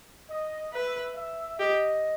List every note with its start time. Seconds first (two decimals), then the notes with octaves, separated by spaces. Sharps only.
0.30 D#5
0.73 B4 E5
1.16 E5
1.59 G4 D#5